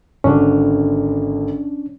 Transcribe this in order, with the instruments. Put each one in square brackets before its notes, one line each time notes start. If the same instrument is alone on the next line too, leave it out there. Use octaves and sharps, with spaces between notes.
[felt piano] G#1 D3 [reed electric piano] C#4 D4